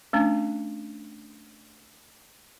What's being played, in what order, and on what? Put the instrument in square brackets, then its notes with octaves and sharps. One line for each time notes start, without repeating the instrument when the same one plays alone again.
[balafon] A3 C#4 D4